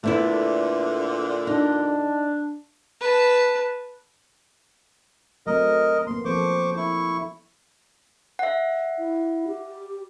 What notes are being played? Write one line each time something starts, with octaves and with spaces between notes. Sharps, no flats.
A#2 D3 A3 B3 E4
D4 D#4
B4 A5
F#3 A3 C4 A#4 D#5
A#3 B3 C6
F3 C4 A4 C5 C#6 D6
E4 C#6
E5 F#5
E4
G4